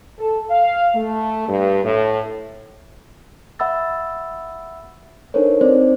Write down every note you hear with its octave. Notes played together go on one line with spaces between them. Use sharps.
A4
F5
A3
G2
A2
E5 F#5 B5 E6 A6
D4 D#4 A4 A#4 C5 C#5
C4 D#4 C5 D5